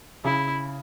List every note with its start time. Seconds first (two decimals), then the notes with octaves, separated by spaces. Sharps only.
0.25 C#3 E4